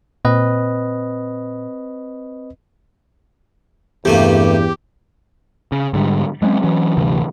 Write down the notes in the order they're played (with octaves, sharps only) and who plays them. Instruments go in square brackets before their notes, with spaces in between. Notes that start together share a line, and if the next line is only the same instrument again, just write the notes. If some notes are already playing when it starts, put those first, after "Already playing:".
[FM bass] A#2 [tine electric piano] C4 B4 D#5
[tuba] E2 [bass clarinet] G2 [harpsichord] C3 A3 A#3 [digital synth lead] G4
[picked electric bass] C#3
G#2 D3 G3
F#3 G#3 C4 C#4
E3 F#3 C#4
D2 G2 C3 E3